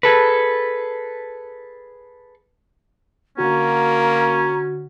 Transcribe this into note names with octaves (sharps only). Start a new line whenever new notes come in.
G#4 A4 B4
D3 A#3 C#4 F#4 A#5